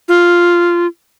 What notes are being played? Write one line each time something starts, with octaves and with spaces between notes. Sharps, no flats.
F4